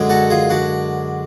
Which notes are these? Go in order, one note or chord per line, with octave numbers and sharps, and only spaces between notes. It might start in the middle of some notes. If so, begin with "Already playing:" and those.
Already playing: F#2 D3 G#3
F#4 A4
F4 G#4
D4 F#4